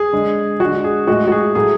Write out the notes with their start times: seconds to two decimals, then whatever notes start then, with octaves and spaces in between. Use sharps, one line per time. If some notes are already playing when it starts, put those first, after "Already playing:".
Already playing: G#4
0.13 D3 G#3
0.60 D3 G#3 F#4
0.84 G#4
1.07 A2 G#3 F#4
1.28 F#4
1.32 G#4
1.55 A2 F#3 A3 G#4